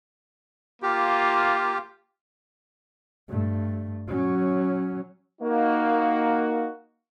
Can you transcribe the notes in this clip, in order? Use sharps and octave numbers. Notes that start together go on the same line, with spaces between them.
A#3 F4 G4
G2 A3
F#3 C#4
A#3 D#4 F#4